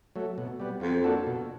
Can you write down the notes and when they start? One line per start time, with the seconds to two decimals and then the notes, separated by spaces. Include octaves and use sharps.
0.16 F#3 A3
0.38 B2
0.60 G3 B3
0.81 F2 F3
1.04 A#3 D4 F#4 A4
1.27 B2